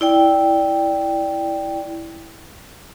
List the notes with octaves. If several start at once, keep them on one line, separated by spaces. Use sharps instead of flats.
E4 D5 G5